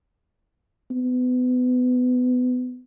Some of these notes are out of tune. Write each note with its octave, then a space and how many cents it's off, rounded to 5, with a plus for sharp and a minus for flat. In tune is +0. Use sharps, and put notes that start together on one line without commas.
B3 +25